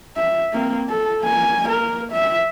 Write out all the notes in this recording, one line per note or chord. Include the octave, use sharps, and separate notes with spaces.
E5
A#3 C4
A4
A#3 G#5
A#3 A#4
E5